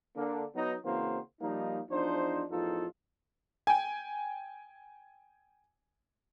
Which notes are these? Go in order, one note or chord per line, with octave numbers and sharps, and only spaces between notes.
D3 A#3 D4
F#3 B3 D#4
C#3 E3 A#3 C4 F#4 C5
F3 G3 A#3 D#4
E2 F3 D4 D#4 C5
A1 E2 F3 D#4 F4 A4
G5 G#5